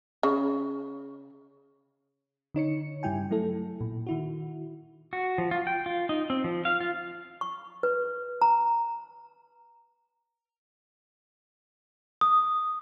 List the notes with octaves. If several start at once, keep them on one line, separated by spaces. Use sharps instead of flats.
C#3
D3 D#4 C#5 C#7
G2 C#3 G3 E4 G5 G#5
F#3 A3 E4 A4
A#2
D#3 E4 F#4
F#4
F3
F4
G5
F4
D#4
C4
F3
F5
F4
C#6
B4
A#5
D#6